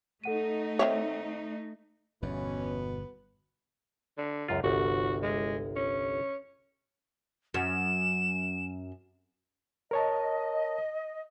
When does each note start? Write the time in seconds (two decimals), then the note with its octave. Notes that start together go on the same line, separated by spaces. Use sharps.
0.24 A3 D#4 A4 F#5 D#7
0.79 D#3 C4 C#5 E5
2.22 G1 E2 B2 E3 B3 C#4
4.18 D3
4.48 C#2 F#2 F4
4.64 G1 C2 F#4
5.23 G#3
5.76 C#4
7.54 F#2 E7
9.91 A#4 C#5 D#5 A5